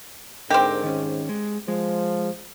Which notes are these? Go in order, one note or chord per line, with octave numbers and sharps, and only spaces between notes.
G#2 D3 C4 G4 A#4
D#3 C#4
G#3
F3 G#3